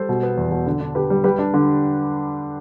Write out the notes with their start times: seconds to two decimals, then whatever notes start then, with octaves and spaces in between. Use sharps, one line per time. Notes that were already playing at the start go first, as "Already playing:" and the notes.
Already playing: G3 A4 C5
0.09 B2
0.23 B3
0.37 E2
0.51 B2
0.66 D3
0.80 D4
0.95 D3 G4 B4
1.10 G3
1.24 G3 G4 B4
1.39 D4
1.54 D3